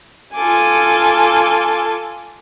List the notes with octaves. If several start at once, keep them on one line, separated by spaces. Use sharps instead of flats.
F4 A4 G#5 D6